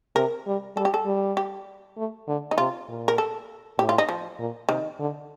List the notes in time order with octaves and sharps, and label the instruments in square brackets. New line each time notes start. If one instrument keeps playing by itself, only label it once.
[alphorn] C3 [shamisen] A#4
[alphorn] G3
[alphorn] G3 [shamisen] A4
[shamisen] G4
A4
[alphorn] G3
[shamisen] G4
[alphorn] A3
D3
[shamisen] D#4
[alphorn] C3 [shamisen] F4
[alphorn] A#2
[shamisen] A#4
A4
[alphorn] A2 [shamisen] G4
[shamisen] F4
D#4
F3
[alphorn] A#2
[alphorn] C3 [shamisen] D#3
[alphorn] D3